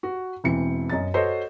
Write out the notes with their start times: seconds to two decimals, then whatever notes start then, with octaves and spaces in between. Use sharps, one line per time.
0.03 F#4
0.44 E1 E3 C4 C#7
0.90 F#2 D#5 A6
1.14 F#4 A4 C5 C#5 D#5